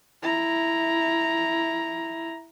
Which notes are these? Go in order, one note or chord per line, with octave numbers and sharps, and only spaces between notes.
E4 A#5